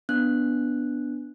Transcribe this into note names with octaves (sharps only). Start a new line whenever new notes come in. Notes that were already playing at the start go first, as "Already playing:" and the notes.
B3 D4 F#6